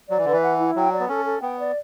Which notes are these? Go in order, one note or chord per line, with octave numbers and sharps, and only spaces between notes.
F#3 D5
E3
D3 B4
E3
F#5
E4
F#3 G5
D5
B3
C#4 A4
A4
B3 G5
D5